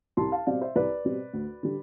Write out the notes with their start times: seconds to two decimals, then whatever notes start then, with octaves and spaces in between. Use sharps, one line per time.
0.17 C2 A5 C6
0.32 F5 A5
0.47 B2 G3 C4 D5 F5
0.61 C5 E5
0.76 C2 B4 D5
1.05 B2 G3 C4
1.33 D2
1.63 D3 G3